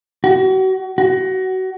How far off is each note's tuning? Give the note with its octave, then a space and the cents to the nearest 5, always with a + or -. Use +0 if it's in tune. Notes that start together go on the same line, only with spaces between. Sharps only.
F#4 +35
F#4 +25